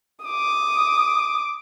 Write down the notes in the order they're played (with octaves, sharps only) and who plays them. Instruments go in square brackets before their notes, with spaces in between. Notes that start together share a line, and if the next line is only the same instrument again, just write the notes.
[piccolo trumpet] D6 [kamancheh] D#6